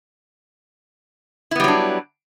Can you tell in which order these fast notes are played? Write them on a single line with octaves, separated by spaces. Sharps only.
E4 B3 G3 F#3 D4